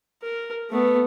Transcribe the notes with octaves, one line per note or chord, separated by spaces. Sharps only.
A#4
A3 B3